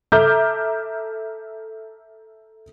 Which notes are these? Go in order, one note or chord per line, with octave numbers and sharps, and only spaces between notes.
A4 E5 A#5 D6 F6 G6